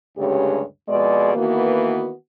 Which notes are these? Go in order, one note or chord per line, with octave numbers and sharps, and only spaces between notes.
D2 G2 C#3 G#3 G4 C#5
F2 B2 G#3 G#4 D5
D#3 E3 A#3 B3 F#4